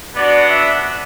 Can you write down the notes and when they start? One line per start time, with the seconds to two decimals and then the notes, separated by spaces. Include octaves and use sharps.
0.15 B3 D4 F#4 D5
0.49 E5